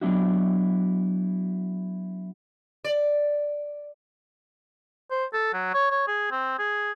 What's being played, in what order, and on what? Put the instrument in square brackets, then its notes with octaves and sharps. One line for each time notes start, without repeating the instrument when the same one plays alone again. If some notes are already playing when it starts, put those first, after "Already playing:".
[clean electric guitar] F#3 B3 D4 E4 F#4
[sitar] D5
[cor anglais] C5
A4
F#3
C#5
C#5
G#4
C4
G#4